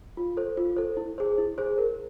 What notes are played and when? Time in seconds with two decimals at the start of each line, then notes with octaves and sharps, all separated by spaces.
0.17 F4
0.37 A4 C5
0.57 F4
0.76 A4 C5
0.97 E4
1.18 G#4 C5
1.38 E4
1.58 G#4 C5
1.78 A#4